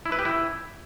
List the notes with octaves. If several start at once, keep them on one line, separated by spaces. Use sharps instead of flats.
E4
B4
G4
E4